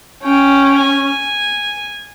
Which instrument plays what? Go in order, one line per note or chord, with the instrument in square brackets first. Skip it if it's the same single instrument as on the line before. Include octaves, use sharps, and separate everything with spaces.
[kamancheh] C#4 [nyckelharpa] G5
[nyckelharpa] G#5